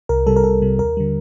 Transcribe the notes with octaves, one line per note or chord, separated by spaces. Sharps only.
C2 A#4
C3 G3 A4
A#4
C2 A4
C3 G3
D#2 A#4
D3 G3